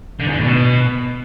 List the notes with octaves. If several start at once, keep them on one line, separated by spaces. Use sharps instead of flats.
D3
E2
D3
A2
B2